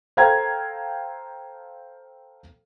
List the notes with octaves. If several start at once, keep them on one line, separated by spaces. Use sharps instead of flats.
A4 C5 F5 G5 A#5 G#6